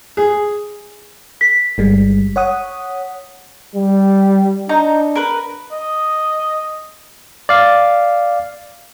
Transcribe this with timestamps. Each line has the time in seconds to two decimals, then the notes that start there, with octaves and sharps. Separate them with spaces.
0.17 G#4
1.41 B6
1.78 G1 G3 G#3
2.36 C#5 F#5 D#6
3.75 G3
4.69 D4 D#4 A#5
5.15 A#4 B4
5.72 D#5
7.49 D5 F5